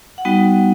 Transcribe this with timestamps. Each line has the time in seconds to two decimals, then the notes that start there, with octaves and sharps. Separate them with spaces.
0.18 F#5
0.25 G3 B3 D#4 F#4 G5